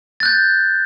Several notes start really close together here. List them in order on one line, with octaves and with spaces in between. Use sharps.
A6 F#6 G6